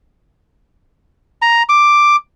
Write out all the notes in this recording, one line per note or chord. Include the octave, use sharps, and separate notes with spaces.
A#5
D6